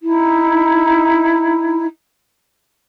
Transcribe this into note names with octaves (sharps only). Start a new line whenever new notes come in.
D#4 E4